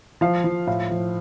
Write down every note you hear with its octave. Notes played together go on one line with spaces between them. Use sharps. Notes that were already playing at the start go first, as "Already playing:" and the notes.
F3 F5
F3
A2 F5
F3